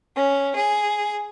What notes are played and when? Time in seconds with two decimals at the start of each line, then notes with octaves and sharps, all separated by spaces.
0.15 C#4
0.56 G#4